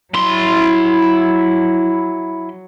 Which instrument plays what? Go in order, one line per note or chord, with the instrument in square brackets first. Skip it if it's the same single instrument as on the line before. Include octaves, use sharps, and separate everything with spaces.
[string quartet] F#3 [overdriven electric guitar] E4 C6